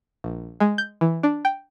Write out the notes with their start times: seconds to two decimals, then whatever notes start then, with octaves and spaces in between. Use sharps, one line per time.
0.24 A#1
0.60 G#3
0.78 G6
1.01 E3
1.23 D4
1.45 G5